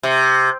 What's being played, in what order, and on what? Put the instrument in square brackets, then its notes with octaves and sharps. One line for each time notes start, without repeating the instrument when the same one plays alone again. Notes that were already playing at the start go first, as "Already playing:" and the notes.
[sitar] C3